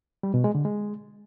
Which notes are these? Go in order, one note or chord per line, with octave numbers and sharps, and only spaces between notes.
G3
B2
G#3
D3
G#3